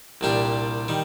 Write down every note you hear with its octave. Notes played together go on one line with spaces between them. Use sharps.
C2 A#2 G3 D4 G4
D#3 G3